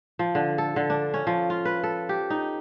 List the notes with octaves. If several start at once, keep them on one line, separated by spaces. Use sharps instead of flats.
F3
D3
A4
D3
D4
C#4
F3
F4
B4
A4
G4
D#4